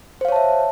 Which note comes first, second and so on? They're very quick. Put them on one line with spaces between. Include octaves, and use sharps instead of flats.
C5 F5 C#5 A5 E5